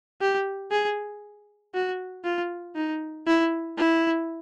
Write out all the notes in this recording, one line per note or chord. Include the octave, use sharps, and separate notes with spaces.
G4
G#4
F#4
F4
D#4
E4
E4